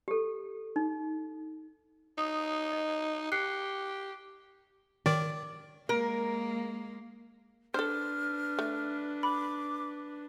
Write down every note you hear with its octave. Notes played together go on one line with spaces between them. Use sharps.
G4 A4
D#4
D#4 D#6
D#5
G4 F#6 C7 C#7
D#3 D5
G#3 A#3 A#4
D4 A4 B4 C5 F6
A3
B5 D6